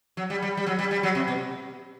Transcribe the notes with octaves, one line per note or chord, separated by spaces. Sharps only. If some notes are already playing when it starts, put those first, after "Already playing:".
F#3
G3
G3
G3
F#3
G3
G3
F#3
C3
B2